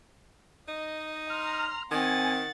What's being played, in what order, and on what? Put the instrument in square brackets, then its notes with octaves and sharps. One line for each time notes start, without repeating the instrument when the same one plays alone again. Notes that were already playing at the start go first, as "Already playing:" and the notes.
[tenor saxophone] D#4 [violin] D#5
[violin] A#5 C6 [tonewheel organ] F6
[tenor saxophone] D#3 [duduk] C4 [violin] F#5 A6 [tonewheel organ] G#5